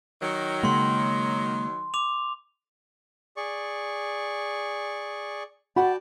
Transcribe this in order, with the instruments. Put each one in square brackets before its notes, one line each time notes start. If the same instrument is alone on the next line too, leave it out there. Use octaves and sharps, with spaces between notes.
[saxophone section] D#3 F#3
[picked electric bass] C#3 G#3 A#3 [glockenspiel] B5 C6
[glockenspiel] D6 F7
[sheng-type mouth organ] G#4 D5 C#6
[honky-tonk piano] F#4 [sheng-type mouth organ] D5 G5 A5 [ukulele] F#5 B5